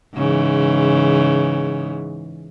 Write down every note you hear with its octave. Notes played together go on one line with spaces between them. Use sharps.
G#2 C#3 E3